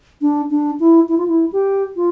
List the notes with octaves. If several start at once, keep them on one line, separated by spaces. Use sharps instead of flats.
D4
D4
E4
E4
F4
E4
G4
F4